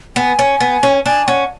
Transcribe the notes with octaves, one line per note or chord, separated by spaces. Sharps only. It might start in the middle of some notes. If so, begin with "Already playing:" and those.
B3 G#5
C#4
B3
C#4
D4 G#5
C#4 F#5